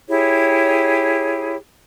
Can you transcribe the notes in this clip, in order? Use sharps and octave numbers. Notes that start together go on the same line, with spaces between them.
E4 G4 G#4 C#5